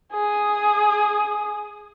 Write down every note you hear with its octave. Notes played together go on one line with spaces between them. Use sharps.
G#4 D#6